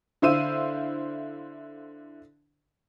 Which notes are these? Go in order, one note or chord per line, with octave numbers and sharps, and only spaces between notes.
D3 E4 C5 F5 E6 D#7